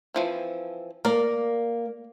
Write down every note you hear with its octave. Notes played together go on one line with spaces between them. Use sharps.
E3 F3 C4
A#3 A#4 D5